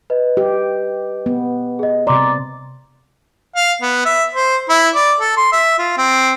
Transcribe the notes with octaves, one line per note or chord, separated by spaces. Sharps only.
B4 D#5
G4
B3
G#4 D#5
C3 D5 A#5 C6 D6
F5
B3
E5
C5
E4
D5
A4
C6
E5
F4
C4